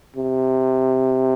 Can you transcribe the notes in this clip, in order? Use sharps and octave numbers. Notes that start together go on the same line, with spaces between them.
C3